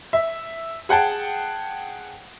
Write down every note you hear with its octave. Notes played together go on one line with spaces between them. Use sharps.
E5
G#4 F#5 G5 A5